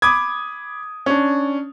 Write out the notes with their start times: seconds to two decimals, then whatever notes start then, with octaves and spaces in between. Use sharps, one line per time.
0.02 B5 D6 D#6 G#6
1.06 C#4 D4